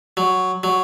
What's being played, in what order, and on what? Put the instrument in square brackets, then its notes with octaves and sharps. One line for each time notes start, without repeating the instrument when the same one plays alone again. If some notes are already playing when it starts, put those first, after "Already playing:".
[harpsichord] F#3
F#3